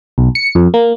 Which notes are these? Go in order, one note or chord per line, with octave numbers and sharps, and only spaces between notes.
B1
C#7
F2
A#3